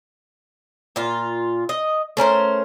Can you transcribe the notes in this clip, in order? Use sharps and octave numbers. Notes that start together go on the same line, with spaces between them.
A#2 F4
D#5
A3 C#4 A#4 C5